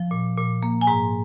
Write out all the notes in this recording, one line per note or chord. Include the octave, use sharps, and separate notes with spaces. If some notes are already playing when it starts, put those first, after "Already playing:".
Already playing: F3
A#2
A#2
A#3
G#5
G#2 A#5